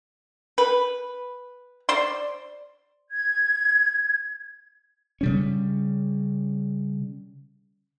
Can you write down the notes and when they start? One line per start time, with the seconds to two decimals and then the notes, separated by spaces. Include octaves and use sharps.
0.58 B4
1.89 C5 D5 C6
3.10 G#6
5.21 C#3 G3 C#4